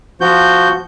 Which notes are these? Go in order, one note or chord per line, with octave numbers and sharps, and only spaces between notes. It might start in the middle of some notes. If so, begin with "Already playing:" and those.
F3 F#4 G6